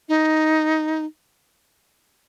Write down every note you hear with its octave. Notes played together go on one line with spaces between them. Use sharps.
D#4